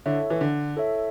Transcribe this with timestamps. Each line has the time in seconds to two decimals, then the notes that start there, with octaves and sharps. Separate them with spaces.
0.06 D3 E4 A4 C#5 E5
0.30 E3
0.41 D3
0.76 E4 A4 C#5 E5